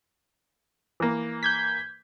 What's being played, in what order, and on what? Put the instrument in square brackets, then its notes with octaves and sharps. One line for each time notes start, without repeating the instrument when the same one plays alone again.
[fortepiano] E3 A#3
[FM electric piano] G6 G#6 B6